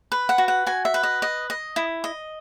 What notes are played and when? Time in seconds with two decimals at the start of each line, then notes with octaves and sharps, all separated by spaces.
0.12 B4
0.29 F#5
0.38 F#4
0.48 F#5
0.66 F#4 G#5
0.85 E5
0.94 B4
1.03 D#5
1.22 D#5
1.50 D#5
1.76 E4
2.04 D#5